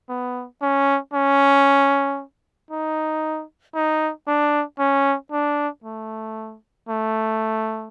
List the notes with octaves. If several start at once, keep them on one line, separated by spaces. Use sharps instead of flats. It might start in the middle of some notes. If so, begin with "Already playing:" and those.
B3
C#4
C#4
D#4
D#4
D4
C#4
D4
A3
A3